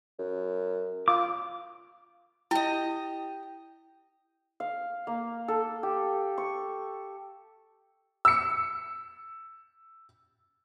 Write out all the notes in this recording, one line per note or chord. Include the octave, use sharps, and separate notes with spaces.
F#2
F4 D6
E4 G4 D#5
F5
A#3
A4
G4
C#6
E6 C#7